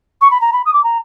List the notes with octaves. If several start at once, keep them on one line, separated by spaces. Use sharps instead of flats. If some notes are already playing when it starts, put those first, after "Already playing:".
C#6
B5
A#5
B5
D#6
D6
A#5